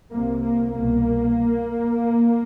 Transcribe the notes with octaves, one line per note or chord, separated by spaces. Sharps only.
C2 C3 A#3
A#3
C2 B2 A#3